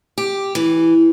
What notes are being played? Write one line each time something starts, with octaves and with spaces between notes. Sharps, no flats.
G4
E3